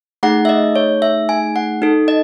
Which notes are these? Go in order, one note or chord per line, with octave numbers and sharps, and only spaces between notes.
A3 D#4 G#4 F#5
E5
D#5
C#5
E5
G#5
F#5
D#4 A4
D#5